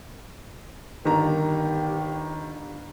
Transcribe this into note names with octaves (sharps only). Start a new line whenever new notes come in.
G1 D#3 G4 A#5